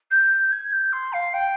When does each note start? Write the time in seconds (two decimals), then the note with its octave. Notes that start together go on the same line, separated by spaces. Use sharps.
0.11 G6
0.52 G#6
0.72 G6
0.92 C6
1.12 F5
1.33 G5